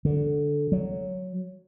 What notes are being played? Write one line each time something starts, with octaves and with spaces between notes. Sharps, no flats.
D3
F#3